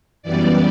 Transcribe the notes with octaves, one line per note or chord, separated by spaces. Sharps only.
F#2 E3 G3 B3 D5